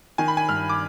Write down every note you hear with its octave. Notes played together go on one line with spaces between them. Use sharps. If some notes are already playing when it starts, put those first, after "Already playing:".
D#3 G#5
B5
G#5
G2 F6
D6